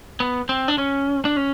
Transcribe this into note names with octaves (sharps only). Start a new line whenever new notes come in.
B3
C4
D4
C#4
D4
C#4